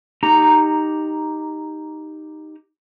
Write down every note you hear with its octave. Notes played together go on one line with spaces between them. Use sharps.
D#4 G4 A#5